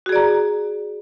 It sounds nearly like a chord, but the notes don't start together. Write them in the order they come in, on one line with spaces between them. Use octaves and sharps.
F#4 G#4 D5 A#5